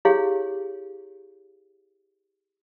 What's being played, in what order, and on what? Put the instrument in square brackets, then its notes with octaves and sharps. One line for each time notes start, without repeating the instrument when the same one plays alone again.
[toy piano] E4 G4 G#4 C#5 F5